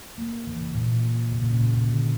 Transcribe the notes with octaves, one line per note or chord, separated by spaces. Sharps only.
A#3
E3
C#3
A#2
C#3
A#2
C#3
A#2
C#3
D3